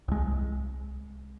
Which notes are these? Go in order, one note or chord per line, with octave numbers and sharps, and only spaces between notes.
C2 G#3